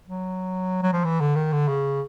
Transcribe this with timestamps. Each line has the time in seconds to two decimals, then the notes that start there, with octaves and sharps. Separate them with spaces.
0.09 F#3
0.83 F#3
0.93 F3
1.04 E3
1.21 D3
1.36 D#3
1.53 D3
1.68 C#3